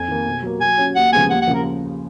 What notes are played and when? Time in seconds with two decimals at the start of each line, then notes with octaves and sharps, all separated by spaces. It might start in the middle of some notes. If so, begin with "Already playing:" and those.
Already playing: F2 G#5
0.08 D#3 A#3
0.26 B2
0.43 F#3 A#3
0.61 F#3 G#5
0.78 C#4 F#4 C#5
0.96 D#2 F#5
1.13 C#3 F3 G#3 B3 G#5
1.30 D#2 F#5
1.42 F#5
1.47 C#3 F3 A#3 F4
1.54 A#4